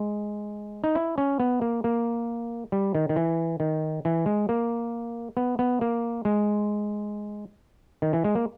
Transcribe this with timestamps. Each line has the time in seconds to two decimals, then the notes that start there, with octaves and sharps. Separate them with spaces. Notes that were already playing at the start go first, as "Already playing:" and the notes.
Already playing: G#3
0.84 D#4
0.95 E4
1.18 C#4
1.40 B3
1.61 A#3
1.84 A#3
2.72 G3
2.95 D#3
3.09 D#3
3.16 E3
3.60 D#3
4.05 E3
4.26 G#3
4.49 A#3
5.37 B3
5.59 B3
5.81 A#3
6.25 G#3
8.02 D#3
8.13 E3
8.24 G#3
8.35 A#3